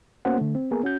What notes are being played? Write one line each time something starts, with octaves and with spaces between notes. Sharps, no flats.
A#3 B3 C#4 F#4 C5 F#5
D3 A3
C4
A#3 B3 G#4 A#4
C#4 F#4 G6